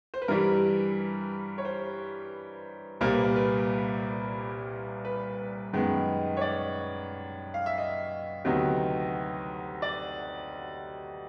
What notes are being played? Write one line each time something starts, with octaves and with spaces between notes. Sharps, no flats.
C5
B4
G2 E3 G3 A#4
C#5
C5
C2 A#2 G3 A#3 C5
B4
A#4
B4
B4
F#2 D#3 G#3 B3
C#5
D5
F5
E5
D#5
D2 C3 D#3 F#3 B3
D5